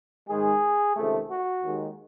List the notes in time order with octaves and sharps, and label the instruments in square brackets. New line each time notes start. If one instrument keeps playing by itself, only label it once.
[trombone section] G#2 D#3 G#3 G#4
C#2 C3 D#3 A3
F#4
D#2 D#3 G#3